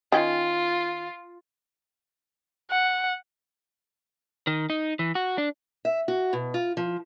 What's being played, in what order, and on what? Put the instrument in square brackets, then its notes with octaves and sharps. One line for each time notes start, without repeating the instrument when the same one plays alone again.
[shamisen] D#3 C#4 G5 [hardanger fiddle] F4
[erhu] F#5
[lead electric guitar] D#3
D#4
E3
F#4
D4
[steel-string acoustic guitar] E5
F#4
B2
F4
F3